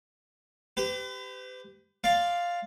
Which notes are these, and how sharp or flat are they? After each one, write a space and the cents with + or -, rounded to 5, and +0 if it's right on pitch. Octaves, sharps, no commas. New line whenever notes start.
G4 +0 B4 +45
D5 +0 F5 +0 C6 +0